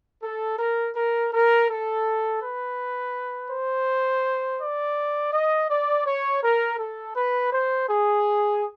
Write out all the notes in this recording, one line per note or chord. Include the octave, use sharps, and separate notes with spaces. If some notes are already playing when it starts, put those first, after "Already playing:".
A4
A#4
A#4
A#4
A4
B4
C5
D5
D#5
D5
C#5
A#4
A4
B4
C5
G#4